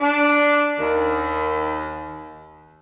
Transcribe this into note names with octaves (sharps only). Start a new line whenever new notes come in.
D4
D#2 D#3